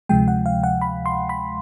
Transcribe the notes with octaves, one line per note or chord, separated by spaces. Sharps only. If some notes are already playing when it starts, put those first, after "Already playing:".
D2 C3 F3 G#3 G5
F#5
F5
F#5
B5
C6
B5